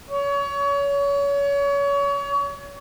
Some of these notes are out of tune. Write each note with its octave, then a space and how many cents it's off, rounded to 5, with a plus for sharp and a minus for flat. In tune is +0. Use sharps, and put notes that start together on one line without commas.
C#5 +30